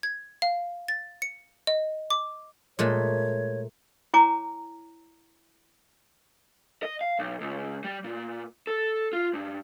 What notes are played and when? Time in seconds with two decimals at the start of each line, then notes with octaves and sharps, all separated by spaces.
0.03 G#6
0.42 F5
0.88 A6
1.22 C#7
1.67 D#5
2.10 D6
2.79 A#2 G#3 A3 C#5
4.14 E4 C#5 G#5 A#5 D6
6.83 D#5
7.01 F5
7.19 B1
7.41 C#2
7.84 G3
8.04 A#2
8.67 A4
9.13 F4
9.33 G2